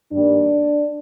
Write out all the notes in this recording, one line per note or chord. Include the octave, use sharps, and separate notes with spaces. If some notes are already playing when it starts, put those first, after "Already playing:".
G2 D#3 G3 A#3 D4